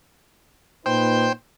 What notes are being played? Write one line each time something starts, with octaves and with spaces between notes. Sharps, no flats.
A#2 D#4 B4 C5 G5